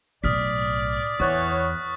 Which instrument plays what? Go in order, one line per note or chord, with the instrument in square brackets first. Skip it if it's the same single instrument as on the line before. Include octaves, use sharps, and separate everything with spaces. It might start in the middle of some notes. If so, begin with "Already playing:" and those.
[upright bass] B1 A2 [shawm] D5 [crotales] D#6 F6 B6
[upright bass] E2 [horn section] E3 B3 C#5 [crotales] C#6 F#6 A6